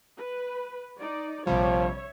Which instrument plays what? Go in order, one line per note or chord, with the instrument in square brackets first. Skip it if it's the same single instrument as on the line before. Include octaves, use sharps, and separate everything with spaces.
[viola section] B4
D#4 D5
[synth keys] A#1 C3 G3 [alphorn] F3 [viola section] C#5 E5